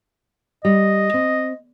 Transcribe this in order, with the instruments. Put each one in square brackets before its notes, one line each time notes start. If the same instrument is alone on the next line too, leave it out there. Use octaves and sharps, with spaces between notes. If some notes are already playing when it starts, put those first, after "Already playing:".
[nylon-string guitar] G3 [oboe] D#5
[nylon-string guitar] C4